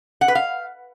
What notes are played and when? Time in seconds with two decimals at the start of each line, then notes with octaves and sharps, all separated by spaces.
0.21 F#5
0.28 B4
0.35 F5